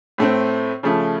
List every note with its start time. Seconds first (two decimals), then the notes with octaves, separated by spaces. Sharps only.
0.18 A2 A3 C4
0.83 C#3 F3 A3